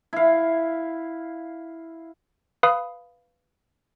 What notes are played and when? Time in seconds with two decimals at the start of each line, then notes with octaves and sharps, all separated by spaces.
0.13 E4 F5
2.63 B4 F5 B5 D#6